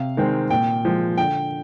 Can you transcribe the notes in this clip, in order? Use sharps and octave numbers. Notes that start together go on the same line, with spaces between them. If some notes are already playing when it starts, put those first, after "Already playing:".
Already playing: C3 F5
D#3 G#3 C4
A#2 G5
F3 G#3
D3 G5